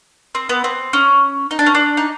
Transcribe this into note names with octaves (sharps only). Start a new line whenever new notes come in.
C4
B3
C4
C#4
D#4
D4
C#4
D4
D#4